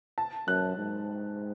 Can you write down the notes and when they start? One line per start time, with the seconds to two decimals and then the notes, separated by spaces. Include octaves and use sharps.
0.18 A5
0.47 F#2 F#6
0.77 G#2